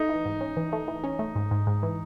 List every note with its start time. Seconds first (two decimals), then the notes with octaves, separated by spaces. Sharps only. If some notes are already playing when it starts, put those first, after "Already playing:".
Already playing: A3 D#4
0.09 E3
0.25 G#2
0.41 C#4
0.57 E3
0.73 A3
0.88 E3
1.04 C#4
1.19 A3
1.36 G#2
1.51 G#2
1.67 G#2
1.83 E3